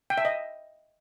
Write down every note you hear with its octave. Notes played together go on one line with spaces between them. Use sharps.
G5
E5
D#5